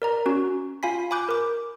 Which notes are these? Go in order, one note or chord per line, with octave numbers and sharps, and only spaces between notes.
A#4 D5 A#5
C#4 F#4
F4 F5 G#5 B5 B6
G#5 B5 D6 F#6 G6
A#4 D6